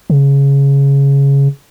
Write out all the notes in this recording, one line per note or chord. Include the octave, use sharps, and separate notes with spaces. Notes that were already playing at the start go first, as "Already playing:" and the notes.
C#3